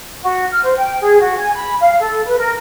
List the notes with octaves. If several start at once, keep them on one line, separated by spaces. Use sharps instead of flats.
F#4
F6
C5
G5
G#4
F#4
G#5
B5
F5
A4
B4
A#4